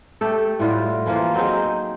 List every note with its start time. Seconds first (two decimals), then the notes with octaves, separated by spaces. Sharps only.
0.21 A3 G4 A4
0.59 A2 G3 F4 F#4
1.06 E3 F3 A#3 F4
1.34 F#3 C4 D#4 G#4